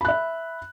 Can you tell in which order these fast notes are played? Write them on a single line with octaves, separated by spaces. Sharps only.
B5 F#6 E5